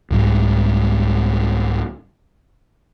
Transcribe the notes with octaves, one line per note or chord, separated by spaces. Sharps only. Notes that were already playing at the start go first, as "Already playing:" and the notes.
C2 G#2 G3